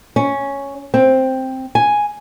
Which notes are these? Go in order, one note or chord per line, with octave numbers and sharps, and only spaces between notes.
C#4
C4
G#5